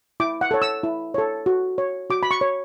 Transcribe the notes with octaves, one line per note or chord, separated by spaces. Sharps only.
E4 D6
F#5
A4 C#5
E6
E4
A4 C#5
F#4
C#5
F#4 D6
B5
C#6
C#5